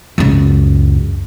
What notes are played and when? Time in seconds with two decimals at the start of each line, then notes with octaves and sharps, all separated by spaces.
0.18 C#2 F#2